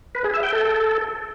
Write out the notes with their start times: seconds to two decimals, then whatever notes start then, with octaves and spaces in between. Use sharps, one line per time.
0.15 B4
0.24 G#4
0.34 E5
0.43 G5
0.53 A4